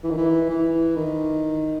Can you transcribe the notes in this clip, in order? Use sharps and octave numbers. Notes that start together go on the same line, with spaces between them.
E3
D#3
E3
E3
D#3